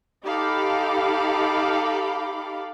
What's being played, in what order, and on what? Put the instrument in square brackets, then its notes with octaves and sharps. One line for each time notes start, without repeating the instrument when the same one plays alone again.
[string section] D#4 G4 A4 F5 B5 D6